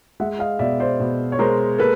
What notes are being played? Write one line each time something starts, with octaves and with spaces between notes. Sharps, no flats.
G#3 E5 F#5
D#5 F5
B2 D5 E5
C5 D5
B2
C#5
G#3 A#4 C5
A#3 A4 B4